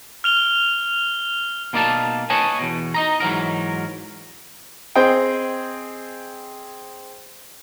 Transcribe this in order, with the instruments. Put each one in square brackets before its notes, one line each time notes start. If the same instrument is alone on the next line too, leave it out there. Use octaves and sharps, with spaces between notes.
[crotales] F6 F7 G7
[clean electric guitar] B2 A#3 D#4 D5 F5 A5
B4 C#5 D#5 G#5 A5
E2 B2
D#4 D#5 A#5
G#2 E3 F#3 A#4
[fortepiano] C4 G#4 C5 D#5 G5